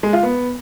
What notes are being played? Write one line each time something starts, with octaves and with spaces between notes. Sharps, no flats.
G#3
F4
B3